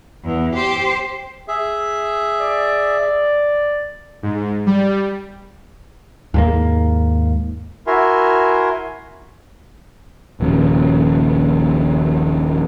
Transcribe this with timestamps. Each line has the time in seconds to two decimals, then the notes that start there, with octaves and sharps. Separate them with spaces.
0.25 E2
0.55 G4 C5
1.48 G#4 E5
2.40 D5
4.23 G#2
4.66 G3
6.34 D#2 G#2 A#3
7.87 E4 F#4 A#4 E5 G#5 C6
10.40 D#1 A#1 D#2 C#3